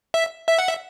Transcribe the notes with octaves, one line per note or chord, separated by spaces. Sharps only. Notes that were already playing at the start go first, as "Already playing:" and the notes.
E5
E5
F#5
E5